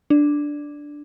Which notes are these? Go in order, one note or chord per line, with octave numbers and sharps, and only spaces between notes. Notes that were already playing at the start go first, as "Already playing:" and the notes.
D4